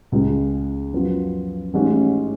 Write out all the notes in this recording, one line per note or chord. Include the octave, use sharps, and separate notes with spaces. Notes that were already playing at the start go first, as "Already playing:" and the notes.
C#2 C#3 G#3
F#2 F3 B3 F4
A1 G#2 G#3 C#4